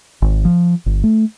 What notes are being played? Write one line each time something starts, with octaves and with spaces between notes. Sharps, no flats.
G#1
F3
G1
A3